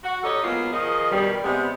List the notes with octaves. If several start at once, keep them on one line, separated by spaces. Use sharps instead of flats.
F#4
D#4 G4 A4 C#5 D#5
F#3 G#3 A#3 B3 F4
D#3 F3 G#4 D#5
G2 B2 D#3 G3
C3 G3 G#3 B3